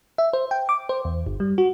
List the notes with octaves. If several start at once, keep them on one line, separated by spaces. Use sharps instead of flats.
E5
C5
G5
D6
C5
E2
G1
G3
F#4